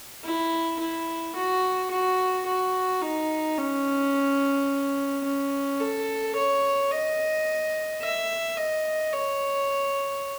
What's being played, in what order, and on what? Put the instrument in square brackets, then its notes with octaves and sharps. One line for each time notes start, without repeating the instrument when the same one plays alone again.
[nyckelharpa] E4
E4
F#4
F#4
F#4
D#4
C#4
C#4
A4
C#5
D#5
E5
D#5
C#5